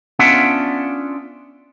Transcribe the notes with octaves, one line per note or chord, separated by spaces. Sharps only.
B3 C#4 D4 F4 E5 F#5